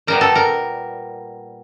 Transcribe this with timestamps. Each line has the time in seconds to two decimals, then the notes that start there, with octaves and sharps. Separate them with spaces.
0.07 A#2 G3 B3 A#4
0.21 A4
0.35 A#4